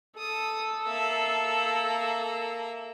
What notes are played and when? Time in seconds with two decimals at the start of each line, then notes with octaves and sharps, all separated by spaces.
0.18 A4 D#6
0.86 A#3 E5